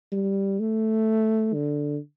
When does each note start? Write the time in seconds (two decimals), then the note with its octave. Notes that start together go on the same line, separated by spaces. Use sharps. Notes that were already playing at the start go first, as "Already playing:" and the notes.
0.12 G3
0.60 A3
1.54 D3